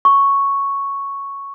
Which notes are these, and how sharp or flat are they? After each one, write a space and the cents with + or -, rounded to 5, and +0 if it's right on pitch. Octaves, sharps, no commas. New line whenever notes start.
C#6 +0